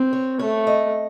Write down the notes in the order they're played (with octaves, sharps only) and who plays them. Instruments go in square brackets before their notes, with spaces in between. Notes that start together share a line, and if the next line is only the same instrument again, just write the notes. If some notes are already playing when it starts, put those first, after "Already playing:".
Already playing: [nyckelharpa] C4
[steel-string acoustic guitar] C#5
[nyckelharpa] A3 [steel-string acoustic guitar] C#5
[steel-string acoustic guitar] D#5